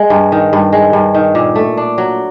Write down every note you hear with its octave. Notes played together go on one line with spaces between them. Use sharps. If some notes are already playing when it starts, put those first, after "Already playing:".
Already playing: G#3
G2
D#3
G2
G#3
G2
D#3
A#2
A3
D4
F#3